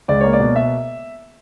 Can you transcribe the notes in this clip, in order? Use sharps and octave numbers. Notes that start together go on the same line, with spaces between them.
C#2 D5
A#3 C#5
D5
B2
E5